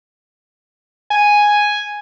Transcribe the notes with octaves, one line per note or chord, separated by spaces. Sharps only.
G#5